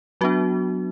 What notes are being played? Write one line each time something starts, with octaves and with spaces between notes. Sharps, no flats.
F#3 B3 D4 F#4